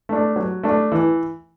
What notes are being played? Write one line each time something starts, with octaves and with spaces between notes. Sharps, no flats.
A3 D4
F#3
A3 D4
E3